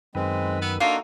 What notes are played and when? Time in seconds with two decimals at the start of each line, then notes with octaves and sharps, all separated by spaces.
0.15 F#2 D#3 G#3 C4 B4
0.62 B3 E6
0.80 A#3 D4 D#4 F4 F#4 A4